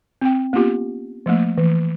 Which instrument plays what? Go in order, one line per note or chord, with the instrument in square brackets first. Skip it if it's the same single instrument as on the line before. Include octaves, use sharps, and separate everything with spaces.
[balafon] C4 G5
A#3 B3 C#4 F4 G4
F3 A3 A#3
E3